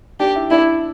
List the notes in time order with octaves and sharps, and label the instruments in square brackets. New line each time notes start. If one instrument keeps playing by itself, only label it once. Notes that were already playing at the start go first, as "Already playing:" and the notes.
[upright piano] D4 [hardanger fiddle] G4
[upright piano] E4
[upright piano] D4 [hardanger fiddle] E4